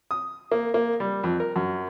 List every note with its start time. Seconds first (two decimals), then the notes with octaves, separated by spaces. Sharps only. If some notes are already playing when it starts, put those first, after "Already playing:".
0.11 D#6
0.52 A#3
0.74 A#3
1.00 G3
1.24 F2
1.40 A#4
1.56 F#2